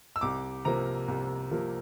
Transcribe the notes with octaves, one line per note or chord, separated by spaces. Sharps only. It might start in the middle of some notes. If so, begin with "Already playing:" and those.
E6
C2 D6
C3 F3 A#3 A#5
C2
C3 F3 A#3